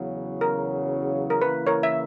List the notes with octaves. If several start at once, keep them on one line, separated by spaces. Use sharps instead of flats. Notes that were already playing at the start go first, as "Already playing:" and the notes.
Already playing: E2 C#3 F#3
A#4
A#4
C#3 E3 A#3 E4 B4
A#4 C#5
E5